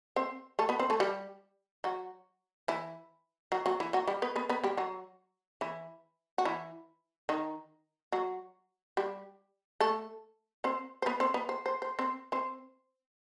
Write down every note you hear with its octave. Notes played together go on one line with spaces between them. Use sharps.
C4 C5
A3 A4
B3 B4
C4 C5
A3 A4
G3 G4
F#3 F#4
E3 E4
F#3 F#4
F#3 F#4
E3 E4
F#3 F#4
G3 G4
B3 B4
B3 B4
B3 B4
G3 G4
F#3 F#4
E3 E4
F#4
E3 E4
D#3 D#4
F#3 F#4
G3 G4
A3 A4
C4 C5
C5
B3 B4
C4 C5
B3 B4
C5
C5
C5
C4 C5
C4 C5